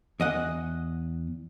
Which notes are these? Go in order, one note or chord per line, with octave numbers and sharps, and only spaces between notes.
E2 D#5 F#5